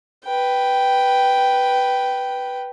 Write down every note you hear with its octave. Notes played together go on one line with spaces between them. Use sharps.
B4 G5